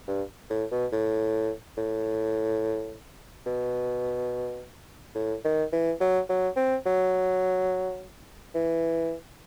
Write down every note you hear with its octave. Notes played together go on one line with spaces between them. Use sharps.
G2
A2
B2
A2
A2
B2
A2
D#3
E3
F#3
F#3
C4
F#3
E3